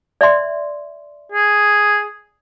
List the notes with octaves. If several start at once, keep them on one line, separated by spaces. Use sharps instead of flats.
D5 E5 C6
G#4